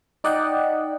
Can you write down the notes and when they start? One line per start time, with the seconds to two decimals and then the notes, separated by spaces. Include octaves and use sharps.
0.24 D#4 D5 D#5 F#5 G5